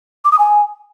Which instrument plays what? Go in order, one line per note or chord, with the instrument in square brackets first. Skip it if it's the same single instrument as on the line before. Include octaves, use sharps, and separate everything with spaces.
[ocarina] D6
D#6
G#5